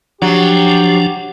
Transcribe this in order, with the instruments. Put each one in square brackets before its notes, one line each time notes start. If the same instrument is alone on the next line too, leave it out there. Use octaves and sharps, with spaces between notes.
[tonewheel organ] F3 D4 [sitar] F#3 [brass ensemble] G4